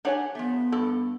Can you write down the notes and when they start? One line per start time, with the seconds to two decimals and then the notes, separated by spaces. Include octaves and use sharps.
0.05 D4 G4 C#5 F#5 G#5
0.35 F3 A3 B3
0.72 G2 A4